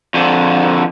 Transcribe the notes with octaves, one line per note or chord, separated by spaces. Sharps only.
F2 D3